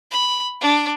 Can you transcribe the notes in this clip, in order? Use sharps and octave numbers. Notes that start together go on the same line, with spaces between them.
B5
D4